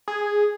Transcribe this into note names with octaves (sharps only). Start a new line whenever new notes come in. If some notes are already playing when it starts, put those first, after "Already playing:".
G#4